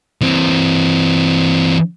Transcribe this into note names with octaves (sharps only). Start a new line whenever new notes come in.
E3 C4